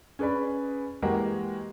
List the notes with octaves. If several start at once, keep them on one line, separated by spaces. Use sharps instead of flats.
C#4 G#4 B4 D5 B5
E3 G#3 A#3 F#4 G4 A#4